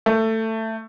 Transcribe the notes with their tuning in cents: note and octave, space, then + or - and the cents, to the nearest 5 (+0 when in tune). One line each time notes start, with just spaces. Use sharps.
A3 +15